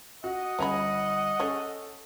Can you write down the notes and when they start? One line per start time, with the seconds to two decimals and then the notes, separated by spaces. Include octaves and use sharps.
0.24 F#4 D#5 F#5
0.59 G1 C#4 G#4 B5 F7
1.40 C#4 G#4 A4 C#5